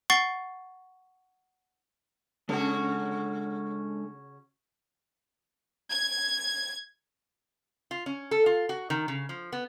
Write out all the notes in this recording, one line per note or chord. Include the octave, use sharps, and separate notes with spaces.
F#5 C#6 A6 C7 G7
C#3 G#3 C#4 D4 F#4 A4
G#6
F4
C#4
A4
F4
F#4
D#3
C#3
F3
B3